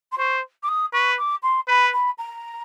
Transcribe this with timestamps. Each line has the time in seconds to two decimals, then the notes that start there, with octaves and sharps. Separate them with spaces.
0.12 C6
0.17 C5 C#6
0.63 D6
0.68 D#6
0.93 B4 C#6
1.18 D6
1.43 C6
1.68 B4 B5
1.93 B5
2.18 A#5